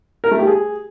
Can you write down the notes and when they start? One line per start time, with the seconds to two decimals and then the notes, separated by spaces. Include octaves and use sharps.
0.24 A#4
0.31 A3
0.39 G4
0.47 G#4